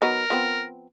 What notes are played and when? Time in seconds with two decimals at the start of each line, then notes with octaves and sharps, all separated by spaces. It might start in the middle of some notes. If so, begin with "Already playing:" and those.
0.02 F#3 B3 D#4 A#4
0.30 F3 B3 C4